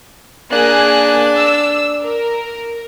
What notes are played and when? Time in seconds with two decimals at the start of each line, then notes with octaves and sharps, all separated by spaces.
0.52 A#3 D4 G#4 F#6
1.37 E6
2.04 A#4